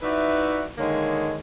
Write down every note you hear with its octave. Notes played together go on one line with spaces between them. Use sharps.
D#4 E4 F#4 B4 D5 E5
D3 D#3 G#3 A#3 C#5